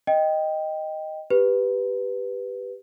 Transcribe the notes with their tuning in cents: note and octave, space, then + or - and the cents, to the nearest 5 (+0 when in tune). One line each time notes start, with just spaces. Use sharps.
D#5 +0 G5 +0
G4 +5 B4 +0